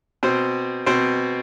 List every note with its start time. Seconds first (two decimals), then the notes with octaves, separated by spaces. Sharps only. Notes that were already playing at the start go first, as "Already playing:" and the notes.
0.23 B2 C4 C5
0.86 B2 C4 C5